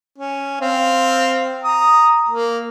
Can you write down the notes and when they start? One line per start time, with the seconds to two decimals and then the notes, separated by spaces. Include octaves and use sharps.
0.18 C#4
0.61 C4 F5
1.64 A#5 D#6
2.28 A#3